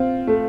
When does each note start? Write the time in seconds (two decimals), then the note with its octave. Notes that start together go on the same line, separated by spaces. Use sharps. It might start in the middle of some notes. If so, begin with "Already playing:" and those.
Already playing: C4 F4
0.27 A3